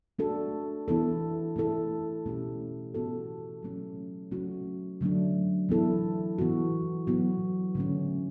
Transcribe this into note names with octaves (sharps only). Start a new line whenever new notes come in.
A3 D4 F#4 A4
E3 B3 E4 A4
A3 E4 A4
B2 A3 C#4 G4
E3 B3 F#4 A4
F#3 A3 C#4
F#3 A3 C#4 F#4
D3 F#3 A3 D4
E3 B3 E4 A4
E3 B3 F#4
F#3 B3 F#4
D3 A3 C#4